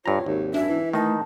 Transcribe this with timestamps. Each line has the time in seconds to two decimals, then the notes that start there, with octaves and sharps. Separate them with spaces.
0.06 G2 F4 C#5 A#5
0.26 G#1 D#2
0.54 F#2 D4 E5
0.69 E3
0.93 D#3 A3 D#4 A5